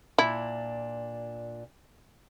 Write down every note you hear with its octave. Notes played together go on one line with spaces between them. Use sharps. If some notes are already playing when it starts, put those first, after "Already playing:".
A#2 D4 E4